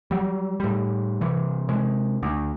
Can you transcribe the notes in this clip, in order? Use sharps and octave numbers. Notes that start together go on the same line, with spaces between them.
F#3 G3
A2 G3
C3 E3
C3 G#3
D2